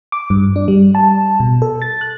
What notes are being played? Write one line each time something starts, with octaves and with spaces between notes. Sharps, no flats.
D6
G2
D4
G3
A5
B2
A4
A6
F#6